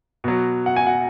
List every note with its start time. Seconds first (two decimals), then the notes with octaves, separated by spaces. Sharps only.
0.24 B2 F#3
0.66 F#5
0.76 G#5
0.87 F#5